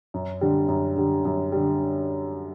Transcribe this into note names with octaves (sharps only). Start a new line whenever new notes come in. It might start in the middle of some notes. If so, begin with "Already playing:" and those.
F#2
D3 G3
F#2
D3 G3
F#2
D3 G3